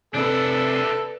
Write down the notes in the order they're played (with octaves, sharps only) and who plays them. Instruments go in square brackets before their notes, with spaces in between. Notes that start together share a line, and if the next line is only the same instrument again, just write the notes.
[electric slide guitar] C3 C4 G#5 [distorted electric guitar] D4 E4 [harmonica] A4 [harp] B4 D5